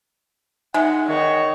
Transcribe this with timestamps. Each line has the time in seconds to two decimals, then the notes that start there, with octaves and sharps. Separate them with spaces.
0.74 G#3 D#4 E5 F#5 G#5
1.07 D#3 C#5